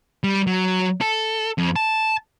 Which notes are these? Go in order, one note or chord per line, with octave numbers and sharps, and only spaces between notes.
G3
F#3
A4
F2
A5